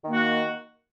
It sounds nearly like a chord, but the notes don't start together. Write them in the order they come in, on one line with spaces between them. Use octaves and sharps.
D#3 A#3 F#4